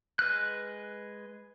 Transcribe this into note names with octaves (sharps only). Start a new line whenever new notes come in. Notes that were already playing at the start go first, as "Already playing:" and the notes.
G#3 B4 F6 F#6